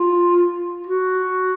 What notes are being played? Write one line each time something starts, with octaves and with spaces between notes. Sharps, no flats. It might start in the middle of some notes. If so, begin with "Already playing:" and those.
Already playing: F4
F#4